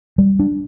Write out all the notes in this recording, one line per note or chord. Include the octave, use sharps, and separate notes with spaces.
G3
D4